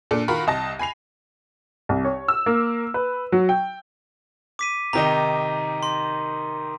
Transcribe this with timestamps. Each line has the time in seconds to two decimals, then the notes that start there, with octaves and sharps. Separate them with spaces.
0.11 A#2 D4 A4
0.28 D#3 F4 F#4 A#4 B5
0.47 C2 D#5 A5 A#6
0.79 G#5 B5 C7 F7
1.89 C2
2.04 C#5
2.28 E6
2.46 A#3
2.94 B4
3.32 F#3
3.49 G5
4.59 D6 B6 D#7
4.93 C3 D#3 D#4 A#5
5.83 C6